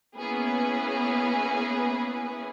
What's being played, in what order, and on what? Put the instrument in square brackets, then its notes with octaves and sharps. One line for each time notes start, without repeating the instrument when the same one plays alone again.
[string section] A#3 B3 C#4 E4 G#4 B4